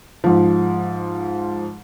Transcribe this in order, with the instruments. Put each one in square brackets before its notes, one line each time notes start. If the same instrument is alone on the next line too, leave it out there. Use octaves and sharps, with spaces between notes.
[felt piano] G#2 F3